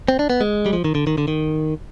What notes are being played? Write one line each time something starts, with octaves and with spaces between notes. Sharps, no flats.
C4
D4
B3
G#3
G3
F3
D#3
D3
D#3
D3
D#3